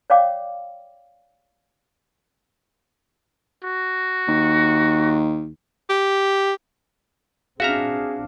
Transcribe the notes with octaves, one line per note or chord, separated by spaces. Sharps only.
C#5 D5 F5 G5 D6
F#4
D#2
G4
C4 D4 F#4 G#4 E5 F5 A#5